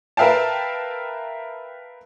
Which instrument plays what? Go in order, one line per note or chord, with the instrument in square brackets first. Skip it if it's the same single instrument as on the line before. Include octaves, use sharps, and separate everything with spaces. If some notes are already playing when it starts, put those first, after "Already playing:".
[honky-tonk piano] A#4 B4 E5 F5 G5 A5